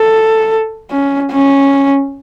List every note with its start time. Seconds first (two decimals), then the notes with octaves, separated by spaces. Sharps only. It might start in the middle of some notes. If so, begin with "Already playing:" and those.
Already playing: A4
0.90 C#4
1.32 C#4